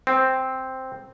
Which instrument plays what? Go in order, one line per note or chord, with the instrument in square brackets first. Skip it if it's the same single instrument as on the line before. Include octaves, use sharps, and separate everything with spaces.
[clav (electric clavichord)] C4